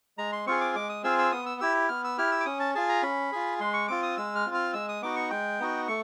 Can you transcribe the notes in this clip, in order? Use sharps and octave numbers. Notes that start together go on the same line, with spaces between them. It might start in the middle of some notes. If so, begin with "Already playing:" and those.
G#3 A#5
C6
C4 F4 G#4 C#6
D6
G#3 D6
D#6
C4 F4 G#4 E6
E6
B3 D#6
E6
E4 G4 E6
B3 F6
E6
E4 G4 F6
E6
D6
C#4 D#6
A5
F4 G#4 A5
A#5
C#4 B5
F4 G#4
G#3 C6
C#6
C4 F4 D6
D#6
G#3 E6
F6
C4 F4
F6
G#3 E6
D#6
B3 D#4 F#4 D6
C#6
G#3 G5
B3 D#4 F#4
A3 C#6